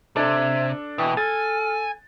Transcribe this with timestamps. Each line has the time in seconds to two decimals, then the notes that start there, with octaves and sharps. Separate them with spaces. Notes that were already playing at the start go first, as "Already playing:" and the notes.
0.16 C3 D4 A4 E5 G#6
0.98 B2 E3 G5 C#6
1.17 A4 G#5 F6 A6